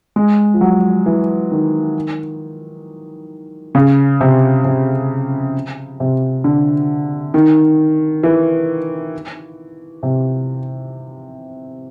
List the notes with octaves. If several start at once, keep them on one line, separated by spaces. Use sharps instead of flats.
G#3
F3
F#3
E3
D#3
C#3
C3
C3
C3
D3
D#3
E3
C3